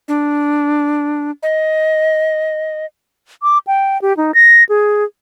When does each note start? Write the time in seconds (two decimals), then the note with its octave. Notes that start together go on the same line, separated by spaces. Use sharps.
0.08 D4
1.43 D#5
3.43 D6
3.67 G5
4.02 G4
4.17 D#4
4.34 A#6
4.69 G#4